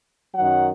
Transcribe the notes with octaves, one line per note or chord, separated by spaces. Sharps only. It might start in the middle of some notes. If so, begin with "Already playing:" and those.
F#2 D#3 F#3 F#5